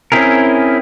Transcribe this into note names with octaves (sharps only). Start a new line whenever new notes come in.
C4 C#4 E4 G#4 A#4